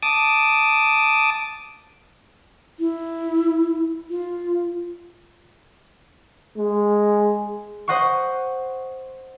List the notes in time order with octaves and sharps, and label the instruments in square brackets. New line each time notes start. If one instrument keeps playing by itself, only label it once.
[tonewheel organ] A5 D6 D#6
[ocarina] E4
F4
[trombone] G#3
[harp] C5 D#5 F#5 C6 C#6